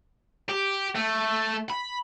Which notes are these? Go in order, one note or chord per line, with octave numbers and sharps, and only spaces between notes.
G4
A3
B5